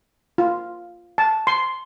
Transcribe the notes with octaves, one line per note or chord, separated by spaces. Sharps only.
F4
A5
C6